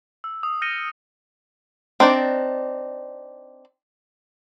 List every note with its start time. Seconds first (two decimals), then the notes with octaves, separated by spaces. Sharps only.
0.24 E6
0.43 D#6
0.62 F6 G6 A#6 C#7 D#7 G7
2.00 C4 D4 D#4 D5